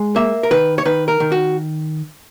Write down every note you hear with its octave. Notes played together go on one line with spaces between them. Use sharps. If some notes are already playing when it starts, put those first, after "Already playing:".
Already playing: G#3
A#3 E5
A#4
D#3 B4
C#5
D#3 B4
A#4
D#3
F#4